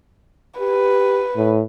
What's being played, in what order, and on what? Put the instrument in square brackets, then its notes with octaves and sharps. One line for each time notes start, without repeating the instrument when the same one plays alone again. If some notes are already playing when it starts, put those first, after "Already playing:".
[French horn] G4 [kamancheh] B4
[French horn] A2